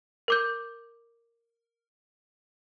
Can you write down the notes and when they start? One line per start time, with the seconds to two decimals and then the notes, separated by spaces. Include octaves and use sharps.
0.28 A#4 D6 G6